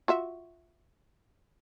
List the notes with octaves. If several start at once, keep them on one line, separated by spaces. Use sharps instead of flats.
F4 F#4 E5